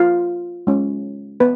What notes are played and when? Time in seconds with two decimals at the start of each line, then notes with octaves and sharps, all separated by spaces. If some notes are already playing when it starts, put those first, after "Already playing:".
Already playing: F4 F5
0.67 G#3 C#4 F4
1.40 B3 B4